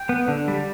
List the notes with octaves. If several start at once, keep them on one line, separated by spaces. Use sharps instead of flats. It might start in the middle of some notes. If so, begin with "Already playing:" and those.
Already playing: G5
B3
D3
G3